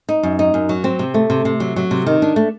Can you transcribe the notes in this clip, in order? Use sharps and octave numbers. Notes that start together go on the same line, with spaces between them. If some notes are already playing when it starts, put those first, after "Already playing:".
D#4
F#2
D#4
F#2
F#3
C4
C3
A3
C3
C3
F#3
F#3
C3
D#3
D4
A3